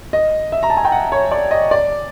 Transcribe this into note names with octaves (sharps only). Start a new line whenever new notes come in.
D#5
E5
A#5
A5
G#5
G5
F#5
C#5
D5
D#5
D5